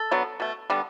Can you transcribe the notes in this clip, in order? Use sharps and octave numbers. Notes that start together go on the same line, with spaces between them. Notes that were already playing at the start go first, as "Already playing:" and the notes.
Already playing: A4
D3 F#3 B3
B2 A3
D3 G3 B3